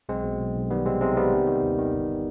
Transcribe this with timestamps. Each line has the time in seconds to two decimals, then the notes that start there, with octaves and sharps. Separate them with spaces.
0.09 B1 G#3 C4
0.24 B2
0.39 B1
0.55 B1
0.70 D#3 G3 B3
0.86 C3 G#3 C4
1.01 C3 G#3 C4
1.17 C3 G3 B3
1.33 D#3
1.47 D#3
1.63 D#2
1.79 D#3
1.94 G1